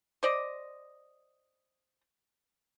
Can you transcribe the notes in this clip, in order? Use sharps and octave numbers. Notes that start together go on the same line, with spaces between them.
C5 D5 D#5